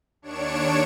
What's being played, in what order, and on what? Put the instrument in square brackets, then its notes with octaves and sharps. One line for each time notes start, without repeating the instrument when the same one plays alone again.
[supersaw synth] D#2 D4 C#5 C#7 D7 E7